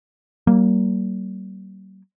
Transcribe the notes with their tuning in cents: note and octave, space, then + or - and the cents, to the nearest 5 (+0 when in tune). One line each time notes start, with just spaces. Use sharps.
G3 -40 A#3 +0